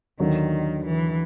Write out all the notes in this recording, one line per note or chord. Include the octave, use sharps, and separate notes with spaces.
D#2 D3 D#3 F#3
E3